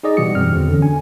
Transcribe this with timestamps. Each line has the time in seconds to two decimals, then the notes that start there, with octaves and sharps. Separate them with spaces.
0.03 D#4 G#4 D5 D#5
0.17 B2 E3 G3 F#4 C#7
0.35 F#2 C4 F6
0.52 E2 D3
0.68 D3 C#4
0.82 G#5